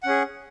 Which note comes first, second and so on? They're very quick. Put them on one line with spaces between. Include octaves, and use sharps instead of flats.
F#5 C#4 G#4